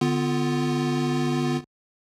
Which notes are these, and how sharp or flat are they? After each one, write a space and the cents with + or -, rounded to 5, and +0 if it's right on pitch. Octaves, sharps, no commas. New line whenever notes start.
D3 +0 B3 +25 F4 +0